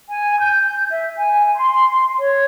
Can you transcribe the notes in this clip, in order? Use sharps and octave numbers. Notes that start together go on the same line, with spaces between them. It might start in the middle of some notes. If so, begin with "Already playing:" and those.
G#5
G6
E5
G#5
C6
C#5